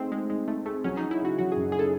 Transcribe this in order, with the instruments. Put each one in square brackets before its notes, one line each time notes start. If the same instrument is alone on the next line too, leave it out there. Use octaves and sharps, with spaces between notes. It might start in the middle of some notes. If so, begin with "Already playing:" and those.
Already playing: [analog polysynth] A3 C4 [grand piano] D#4 G#4
[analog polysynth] G#3 [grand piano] D#4
[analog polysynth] G#3 [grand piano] D#4
[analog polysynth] A3 [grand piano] D#4
[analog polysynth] A3 [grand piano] G#4
[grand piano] F#3 [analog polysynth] C#4
[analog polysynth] D#4
[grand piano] F#3
[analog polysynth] E4
[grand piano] C#3 [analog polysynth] F#4
[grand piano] F#3 [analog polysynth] F#4
[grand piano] F#2 [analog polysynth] G#4
[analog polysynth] G#4
[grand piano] C#3 [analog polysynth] A4